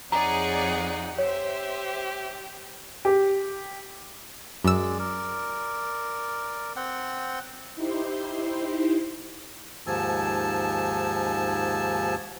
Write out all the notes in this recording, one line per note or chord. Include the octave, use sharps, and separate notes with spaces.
F2 D#4 G#4 C#5 D5 F#5 A#5
G4 C5 C#5 E5
G4
F#2 G#3 D5 E6
A#4 D5
C4 F#5 G5
D#4 E4 G4 C5 C6
D#2 G#2 F3 G#5 A5 E6